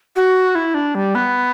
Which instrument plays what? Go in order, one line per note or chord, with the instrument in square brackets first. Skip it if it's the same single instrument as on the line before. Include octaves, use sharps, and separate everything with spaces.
[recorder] F#4
E4
D4
G3
B3